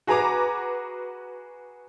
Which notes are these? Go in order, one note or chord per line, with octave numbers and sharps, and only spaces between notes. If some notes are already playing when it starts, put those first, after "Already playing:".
F#4 G#4 B4 A#5 D6